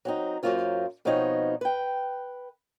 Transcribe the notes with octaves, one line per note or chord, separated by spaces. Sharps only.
F#3 C4 D#4
F#2 D3 F#3 A#3 F4 C5
B2 F3 B3 C4 D#4 C#5
B4 G5